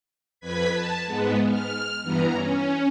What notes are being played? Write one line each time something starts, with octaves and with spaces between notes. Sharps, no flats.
F2 B4 G#6 B6
A5
G#2 G#3 B3
F6
G2 E3 B3 A#5
C#4